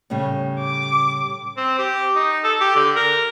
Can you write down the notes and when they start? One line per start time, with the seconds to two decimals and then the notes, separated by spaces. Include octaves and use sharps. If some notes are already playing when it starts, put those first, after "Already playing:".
0.10 A2 C#3 G3
0.59 D6
1.57 C4
1.78 G4
2.16 D#4
2.44 A4
2.61 G4
2.75 D3
2.96 A#4